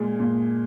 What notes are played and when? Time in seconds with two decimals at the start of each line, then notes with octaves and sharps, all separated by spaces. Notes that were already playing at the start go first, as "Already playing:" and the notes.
Already playing: A#2 G#3
0.20 A#2